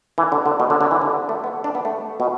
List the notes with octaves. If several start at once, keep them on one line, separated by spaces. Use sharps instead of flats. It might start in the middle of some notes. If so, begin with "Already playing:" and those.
E3
D3
D3
B2
D3
D3
E3
D3
A3
B3
D4
B3
A3
B2